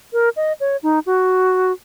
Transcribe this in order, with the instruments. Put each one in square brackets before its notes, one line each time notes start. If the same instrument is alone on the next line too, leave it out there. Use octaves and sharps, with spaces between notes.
[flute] A#4
D#5
C#5
D#4
F#4